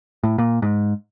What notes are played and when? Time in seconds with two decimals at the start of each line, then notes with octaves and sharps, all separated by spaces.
0.24 A2
0.38 A#2
0.62 G#2